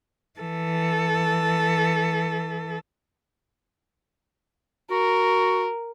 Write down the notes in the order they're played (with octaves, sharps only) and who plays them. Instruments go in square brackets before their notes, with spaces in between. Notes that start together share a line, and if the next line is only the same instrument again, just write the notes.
[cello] E3 A4
[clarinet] F#4 [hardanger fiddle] A#4